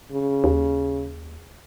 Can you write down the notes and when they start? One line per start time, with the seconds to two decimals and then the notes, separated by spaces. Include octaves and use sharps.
0.12 C#3
0.44 D#2